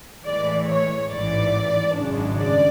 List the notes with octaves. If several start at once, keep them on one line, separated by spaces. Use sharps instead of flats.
A2 E3 G#3 D5
C#5
A1 G#2 E3 D5
G#1 F#2 C#3 G#3 D4
D5